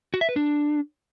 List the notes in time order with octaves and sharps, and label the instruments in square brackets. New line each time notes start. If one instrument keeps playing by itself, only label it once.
[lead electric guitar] F#4
E5
B4
D4